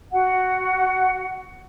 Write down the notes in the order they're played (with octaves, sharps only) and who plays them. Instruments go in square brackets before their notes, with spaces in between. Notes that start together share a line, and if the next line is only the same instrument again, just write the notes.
[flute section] F#4 F#5